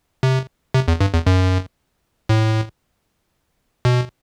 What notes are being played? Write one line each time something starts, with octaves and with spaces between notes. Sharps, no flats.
C3
C3
E2
G2
E2
F#2
A2
B2